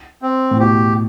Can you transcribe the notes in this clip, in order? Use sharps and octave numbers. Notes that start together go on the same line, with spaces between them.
C4
A2
B2 G4